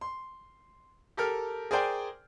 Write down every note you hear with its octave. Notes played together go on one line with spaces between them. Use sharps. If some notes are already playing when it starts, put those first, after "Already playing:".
C6
G4 A4 A#4 F6
G#4 A#4 C5 D5 G5 G#5